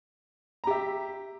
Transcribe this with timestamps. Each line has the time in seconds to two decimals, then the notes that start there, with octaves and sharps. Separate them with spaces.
0.64 A#5
0.67 G4
0.71 E5